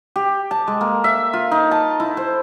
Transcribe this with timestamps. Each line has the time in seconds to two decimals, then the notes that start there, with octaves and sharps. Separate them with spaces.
0.16 G4
0.51 A5
0.67 G#3
0.81 A#3
1.04 E5
1.33 F4
1.52 D#4
1.71 A5
2.00 E4
2.17 C5